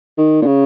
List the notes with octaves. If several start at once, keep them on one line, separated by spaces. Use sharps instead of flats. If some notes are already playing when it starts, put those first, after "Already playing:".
D#3
A#2
C#3